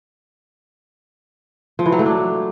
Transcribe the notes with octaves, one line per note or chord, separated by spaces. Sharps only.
F3
E3
F#3
A3
D4